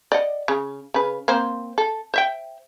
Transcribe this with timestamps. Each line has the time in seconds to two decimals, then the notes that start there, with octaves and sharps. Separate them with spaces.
0.12 D5 D#5 F#5
0.48 C#3
0.94 C#3 B4
1.28 A#3 C4 C5
1.78 A4
2.14 C5 E5 G5